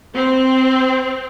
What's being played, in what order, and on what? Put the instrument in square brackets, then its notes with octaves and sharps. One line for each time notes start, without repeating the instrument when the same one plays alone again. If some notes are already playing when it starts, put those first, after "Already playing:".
[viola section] C4